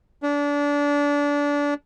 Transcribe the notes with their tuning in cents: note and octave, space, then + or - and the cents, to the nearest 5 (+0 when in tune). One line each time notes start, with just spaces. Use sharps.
D4 -25